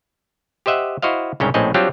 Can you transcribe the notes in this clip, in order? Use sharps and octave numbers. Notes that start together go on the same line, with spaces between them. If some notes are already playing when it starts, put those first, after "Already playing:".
G4 C5 D#5 E5 F#5
E4 F#4 C5 D#5 F5
C2 G#2 C#3 C#4 C#5 G5
A#1 A2 C4 C#4 D#5
F#3 G3 C4 D4 F4 G4